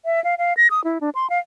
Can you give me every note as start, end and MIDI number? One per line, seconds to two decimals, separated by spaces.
0.05 0.22 76
0.24 0.35 77
0.38 0.53 77
0.57 0.67 94
0.71 0.83 87
0.84 0.98 64
1.01 1.10 62
1.15 1.29 84
1.30 1.39 77